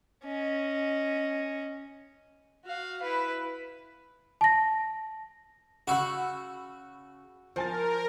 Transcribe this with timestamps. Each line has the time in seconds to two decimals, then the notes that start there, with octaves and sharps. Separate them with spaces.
0.24 C#4 D#5
2.65 F#4 F5
3.02 E4 B4
4.41 A5 A#6
5.87 C#3 F#4 F#5 B5 C#6 E6
7.56 F3 A#4 C5 G#5 A6